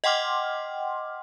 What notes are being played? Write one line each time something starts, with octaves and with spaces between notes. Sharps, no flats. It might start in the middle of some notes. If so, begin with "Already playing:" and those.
D#5 F#5 G5 C6 D6 F6